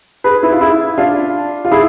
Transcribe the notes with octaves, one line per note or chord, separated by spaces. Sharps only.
G#4 B4
E4
F4
E4 G#4
D4 F4
F4
E4 G#4